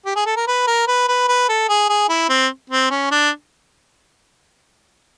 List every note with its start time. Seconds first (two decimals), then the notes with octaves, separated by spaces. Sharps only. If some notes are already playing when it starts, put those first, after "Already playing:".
0.06 G4
0.16 G#4
0.26 A4
0.37 A#4
0.48 B4
0.67 A#4
0.87 B4
1.08 B4
1.28 B4
1.49 A4
1.69 G#4
1.89 G#4
2.09 E4
2.29 C4
2.70 C4
2.90 C#4
3.11 D4